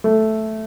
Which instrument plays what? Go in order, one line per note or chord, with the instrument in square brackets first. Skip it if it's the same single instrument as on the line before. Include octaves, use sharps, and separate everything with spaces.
[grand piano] A3